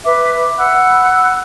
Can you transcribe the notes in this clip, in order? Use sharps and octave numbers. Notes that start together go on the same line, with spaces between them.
B4 E5 D6
F#5 B5 E6 F#6